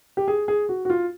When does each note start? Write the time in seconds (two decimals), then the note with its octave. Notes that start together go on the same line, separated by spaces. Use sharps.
0.17 G4
0.28 G#4
0.48 G#4
0.69 F#4
0.85 F#4
0.90 F4